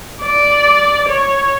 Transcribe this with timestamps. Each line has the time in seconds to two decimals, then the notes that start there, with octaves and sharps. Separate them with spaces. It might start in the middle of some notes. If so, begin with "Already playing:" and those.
0.23 D5
1.09 C#5